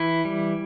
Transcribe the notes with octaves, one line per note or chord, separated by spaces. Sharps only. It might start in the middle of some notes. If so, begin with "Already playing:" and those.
Already playing: E3 E4
G3